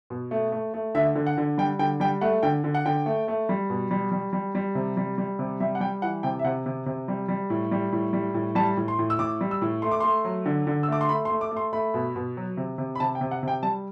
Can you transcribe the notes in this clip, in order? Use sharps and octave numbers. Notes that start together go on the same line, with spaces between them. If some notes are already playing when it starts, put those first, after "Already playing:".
B2
A3
A3
A3
D3 E5
D3
F#5
D3
G3 G5
D3 G5
G3 G5
A3 F#5
D3 G5
D3
F#5
D3 G5
A3
A3
G3
B2
G3
G3
G3
G3
C3
G3
G3
C3
G3 E5
F#5
G3 G5
E3 F#5
C3 G5
E5
C3 F#5
C3
C3
G3
G3
A2
G3
A2
G3
A2
G3 A5
A2
C6
A2
E6
A2 D6
G3
E6
A2
A3 C6
D6
A3 C6
F#3
D3
D3
E6
A3 D6
C6
A3 B5
C6
A3
D6
A3
C6
A3 B5
B2
B2
F#3
C3
C3
B5
C3 A5
G5
C3
F#5
C3 G5
G3 A5